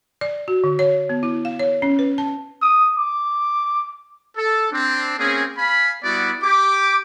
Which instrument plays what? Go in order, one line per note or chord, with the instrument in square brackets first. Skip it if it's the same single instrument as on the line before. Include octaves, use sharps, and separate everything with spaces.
[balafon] D5
F#4
D3
C#5
B3
E4
F5
C#5
C#4
B4
A5
[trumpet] D#6
D6
[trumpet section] A4
C4 D4
A#3 C4 C#4 G#4
F5 G#5 B5
G3 B3 E4 F#4 D5
G4 D6